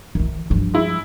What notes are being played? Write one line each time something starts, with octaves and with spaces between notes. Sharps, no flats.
D#3 E3
G2 F3
G#3 E4